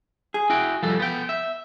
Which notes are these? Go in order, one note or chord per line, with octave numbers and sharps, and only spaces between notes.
G#4
E4 F#4 G5
F3 G3 A4
B3 G5
E5